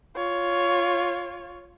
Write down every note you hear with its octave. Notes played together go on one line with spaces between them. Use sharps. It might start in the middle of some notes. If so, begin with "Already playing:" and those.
F4 C#5